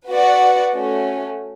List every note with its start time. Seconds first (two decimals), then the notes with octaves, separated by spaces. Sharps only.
0.09 F#4 B4 D5 F#5
0.74 A3 C#4 F#4